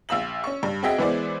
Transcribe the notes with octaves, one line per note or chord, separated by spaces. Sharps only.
A#1 F5 E6 F#7
C#4 C#6
G2
C4 F#4 G#4 D#5 E5 G5
E3 G#3 B3 E4 C5 D5